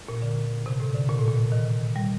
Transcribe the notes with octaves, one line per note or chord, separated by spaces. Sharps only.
A#2
D3
C3
A2
D3
A#2
A2
A#2
D#3
G3